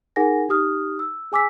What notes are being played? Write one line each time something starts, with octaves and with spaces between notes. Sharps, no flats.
D#4 G#4 A#4 F#5 G#5 A#6
D#4 G4 D#6 F6
E6
G#4 G#5 D6 E6 B6